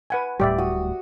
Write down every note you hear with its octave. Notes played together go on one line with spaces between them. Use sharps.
B4 F#5 G#5
D1 A2 G3 G4 D5 E5
F#4 D#6